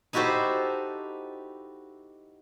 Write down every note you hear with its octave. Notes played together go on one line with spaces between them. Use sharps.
D#4 E4 F#4 G4 A4 C5